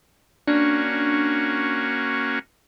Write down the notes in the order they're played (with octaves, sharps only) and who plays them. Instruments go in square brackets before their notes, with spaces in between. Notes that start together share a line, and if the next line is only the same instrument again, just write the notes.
[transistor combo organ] A#3 C#4 F#4 [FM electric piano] D4